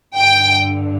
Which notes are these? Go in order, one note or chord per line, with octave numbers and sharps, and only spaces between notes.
G2 D3 G5